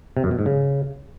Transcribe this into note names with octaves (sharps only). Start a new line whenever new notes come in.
C3
F#2
B2
G#2
C#3